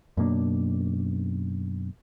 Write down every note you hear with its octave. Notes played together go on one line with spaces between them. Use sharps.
F#2 B2 A#3 D4